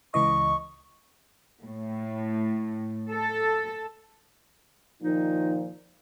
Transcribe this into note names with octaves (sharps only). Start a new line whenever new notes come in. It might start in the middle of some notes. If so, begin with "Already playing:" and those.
C#2 E3 D#5 C#6
A2
A4
A#2 D#3 F3 D#4